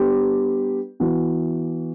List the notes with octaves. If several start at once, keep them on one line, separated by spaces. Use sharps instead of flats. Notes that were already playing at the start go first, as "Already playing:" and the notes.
Already playing: G3 B3 D4 G4
E3 B3 F#4